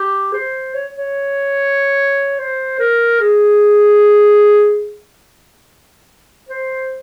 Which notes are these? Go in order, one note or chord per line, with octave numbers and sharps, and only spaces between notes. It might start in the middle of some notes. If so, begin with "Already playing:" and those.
Already playing: G4
C5
C#5
C#5
C5
A#4
G#4
C5